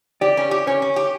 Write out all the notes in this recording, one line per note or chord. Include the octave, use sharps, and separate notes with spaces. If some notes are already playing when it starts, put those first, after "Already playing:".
G4 D5
C#4
G4
C#4 C#5
C#4
G4